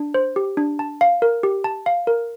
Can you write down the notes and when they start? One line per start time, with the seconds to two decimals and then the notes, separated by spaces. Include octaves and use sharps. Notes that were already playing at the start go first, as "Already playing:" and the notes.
Already playing: D4
0.14 C5
0.36 G4
0.57 D4
0.79 A5
1.01 F5
1.22 A#4
1.43 G4
1.64 A5
1.86 F5
2.07 A#4